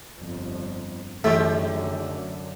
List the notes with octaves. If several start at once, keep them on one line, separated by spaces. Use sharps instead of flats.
G1 F2
F#2 D3 D#3 G#3 A3 G4